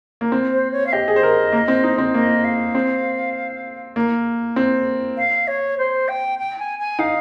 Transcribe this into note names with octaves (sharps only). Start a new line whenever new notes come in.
A#3
C4
C5
C#5
F5
G4 D#5
G#4
C5
A#4
A#3
C4
D#4
C4
A#3 D#5
F5
C4
A#3
C4
F5
C#5
C5
G5
G5
G#5
G#5
D#4 F5